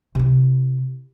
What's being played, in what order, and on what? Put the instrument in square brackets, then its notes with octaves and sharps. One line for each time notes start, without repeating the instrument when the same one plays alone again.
[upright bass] C3 E4